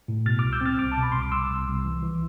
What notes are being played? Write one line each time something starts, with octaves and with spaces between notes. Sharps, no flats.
A2
B2 F6 A6
C2 D6 F6
E6 G6
C4 F6 A6
C2 D6 F6
A5
B2
B5
C2 C6
D6
C2 C6 E6
C2
C2
E3
E3